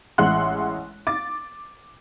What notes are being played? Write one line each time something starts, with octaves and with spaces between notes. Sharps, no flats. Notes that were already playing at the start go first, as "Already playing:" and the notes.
A1 G#3 E5 F#5 C6 F#6
D6 A6